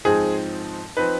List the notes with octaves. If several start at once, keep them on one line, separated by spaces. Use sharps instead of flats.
G#2 F3 C4 D#4 G#4
F3 C4 D#4 B4